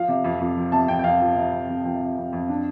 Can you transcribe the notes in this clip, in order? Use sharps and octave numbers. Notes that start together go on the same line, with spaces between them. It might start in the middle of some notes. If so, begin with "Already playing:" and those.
Already playing: F3 F5
C3
F2
F2
F3
C3 A5
F2 G5
G5
F2 F5
F3
C3
F2
F2
F3 G5
C3
F2
F2
D4